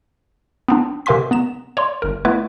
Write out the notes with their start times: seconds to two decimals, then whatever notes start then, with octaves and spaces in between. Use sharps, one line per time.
0.68 B3 C4 D4
1.06 C3 A#4 F5 G#5 C6 B6
1.31 B3 A#5 E7
1.77 C#5 D5 C6
2.02 G1 A#4
2.25 A3 B3 E4 F4 B4